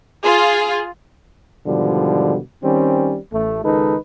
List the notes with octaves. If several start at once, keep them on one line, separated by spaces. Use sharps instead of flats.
F4 G#4
G#2 B2 D3 D#3 F3 G3
D#3 G3 C4 C#4
A1 A3
C#2 D#3 G#3 D#4 A4 B4